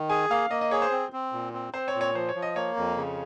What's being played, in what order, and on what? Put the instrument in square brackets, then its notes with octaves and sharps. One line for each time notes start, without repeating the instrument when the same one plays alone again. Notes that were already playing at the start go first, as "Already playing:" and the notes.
Already playing: [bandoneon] D#3
[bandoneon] G#4 [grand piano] G#5
[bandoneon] A#3 [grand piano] F5
[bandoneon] A#3 [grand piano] D#5
[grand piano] D#5
[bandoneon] G#4 [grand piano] C#5
[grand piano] C5
[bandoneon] C4
C4
A#2
C4
[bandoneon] C4 [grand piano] C5
[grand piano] C#5
[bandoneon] A#2
[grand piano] C#5
[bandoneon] F3 [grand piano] C5
[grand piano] C#5
[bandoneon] F3
[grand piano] D#5
[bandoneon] A#3 [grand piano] C#5
[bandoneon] F2
C#3